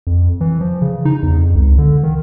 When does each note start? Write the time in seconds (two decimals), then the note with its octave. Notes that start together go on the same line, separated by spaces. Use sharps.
0.07 F2
0.41 E3
0.61 F3
0.82 C#3
1.05 D#4
1.23 E2
1.38 F2
1.55 C#2
1.78 D3
2.03 D#3